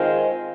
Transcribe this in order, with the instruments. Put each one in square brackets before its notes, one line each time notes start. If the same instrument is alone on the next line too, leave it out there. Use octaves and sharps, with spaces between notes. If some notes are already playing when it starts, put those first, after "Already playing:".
Already playing: [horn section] D#3 G#3 C4 F4